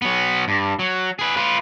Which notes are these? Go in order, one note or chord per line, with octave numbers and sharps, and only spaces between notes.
F#3 B3
G2
F#3
G#4 B4
F4 B4